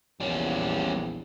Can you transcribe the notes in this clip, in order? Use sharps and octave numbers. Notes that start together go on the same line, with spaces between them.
A#1 E2 G3 C#4